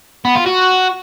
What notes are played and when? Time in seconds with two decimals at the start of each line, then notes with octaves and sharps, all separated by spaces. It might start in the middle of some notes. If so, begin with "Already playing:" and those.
0.25 B3
0.35 F4
0.46 F#4